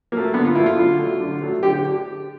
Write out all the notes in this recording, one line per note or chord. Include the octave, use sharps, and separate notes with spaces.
F#3 A3 A#3
D3 B3
F4
F#3 A3 E4
F4
D3
F#3 A3
D3
F#3 A3
D3 G4
G4